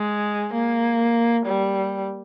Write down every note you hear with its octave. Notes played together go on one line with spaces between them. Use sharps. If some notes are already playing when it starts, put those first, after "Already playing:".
Already playing: G#3
A#3
G3